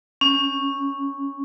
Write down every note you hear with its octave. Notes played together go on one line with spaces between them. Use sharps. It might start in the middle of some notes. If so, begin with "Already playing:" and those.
C#4